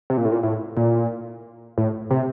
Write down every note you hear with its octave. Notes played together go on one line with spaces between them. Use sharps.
C3
A#2
A2
A#2
A2
A#2
A2
C3